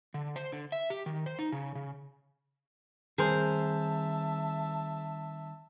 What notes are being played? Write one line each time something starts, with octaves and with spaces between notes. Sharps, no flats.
D3
C5
D3
E5
G4
D#3
C5
D#4
C#3
C#3
D#3 G3 C4 G#4 A#4 C5 E5 A5